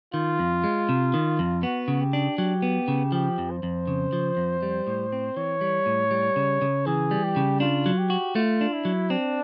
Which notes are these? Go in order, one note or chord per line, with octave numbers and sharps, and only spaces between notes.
D#3 F4
F2
G#3
C3
D#3
F2
B3 F#4
C#3
G4
D4
F#3 G4
B3
C#3
F3 G4
F2
C5
F2
C#3
F3
F2
G3
A2
C4
E3 C#5
G3
A2
G3
C#3
C#3
E3 G#4
G3
G4
C#3
D4 F4
F#3
G4
F#4
A3 F4
D4
E4
F#3
C4 D4